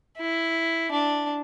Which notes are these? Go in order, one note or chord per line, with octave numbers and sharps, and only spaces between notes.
E4
D4